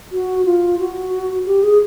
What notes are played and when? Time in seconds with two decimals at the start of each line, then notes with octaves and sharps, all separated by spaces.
0.12 F#4
0.45 F4
0.79 F#4
1.46 G4
1.63 G#4